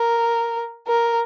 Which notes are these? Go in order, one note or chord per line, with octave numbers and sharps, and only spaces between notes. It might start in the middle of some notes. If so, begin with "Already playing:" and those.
Already playing: A#4
A#4